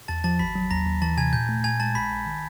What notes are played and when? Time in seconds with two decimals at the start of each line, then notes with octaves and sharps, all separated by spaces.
0.08 E2 A5 A6
0.24 F3 A5 A6
0.39 G#1 B5 B6
0.55 F#3
0.71 D#2 A#5 A#6
0.86 D#2
1.02 E3 A5 A6
1.17 C3 G#5 G#6
1.33 A#2 G6
1.49 A3
1.64 A#2 G#5 G#6
1.80 G#3 A5 A6
1.95 A#1 B5 B6
2.11 A#1
2.26 D#3